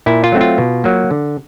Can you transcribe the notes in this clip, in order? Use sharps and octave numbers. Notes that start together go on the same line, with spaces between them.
A#2 E4
F4
F#3 A3 C4
F4
B2
F#3 A#3
D3